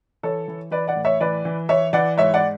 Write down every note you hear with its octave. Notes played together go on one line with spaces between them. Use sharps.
E3 A4 C#5
E3
E3 B4 D5
D5 F#5
A2
C#5 E5
E3 B4 D5
E3
E3 C#5 E5
E3 D5 F#5
G#2 C#5 E5
D5 F#5